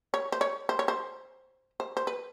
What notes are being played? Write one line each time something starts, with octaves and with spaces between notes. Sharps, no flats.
C#5
C5
C#5
C5
C#5
C5
C5
C5
B4